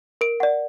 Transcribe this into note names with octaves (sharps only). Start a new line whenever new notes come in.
A#4 D7
D5 F#5